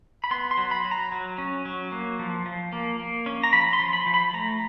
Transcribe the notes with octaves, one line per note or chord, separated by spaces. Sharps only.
B5
B3 C6
C6
F#3
B5
F#3
A#5
F#3
C#4
F#3
A#3
F3
F3
A#3
A#3
C#4
A#5
F3 B5
C6
F3
B5
F3
B5
A3 A#5